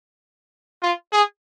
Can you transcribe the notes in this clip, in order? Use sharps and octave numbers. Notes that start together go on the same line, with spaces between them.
F4
G#4